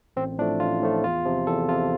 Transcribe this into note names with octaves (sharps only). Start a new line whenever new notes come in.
A1 C4
A2 F3 A3 D4
A1 F4
A2 F3 A3
E2 F4
C3 F3
E2 A4
C3 F3 F4